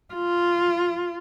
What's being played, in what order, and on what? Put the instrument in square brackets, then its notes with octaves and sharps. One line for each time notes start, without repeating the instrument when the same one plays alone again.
[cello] F4